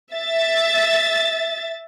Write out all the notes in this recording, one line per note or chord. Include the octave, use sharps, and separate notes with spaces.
E5 A6